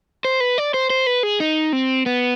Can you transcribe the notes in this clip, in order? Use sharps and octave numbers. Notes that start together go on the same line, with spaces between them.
C5
B4
D5
C5
C5
B4
G#4
D#4
C4
B3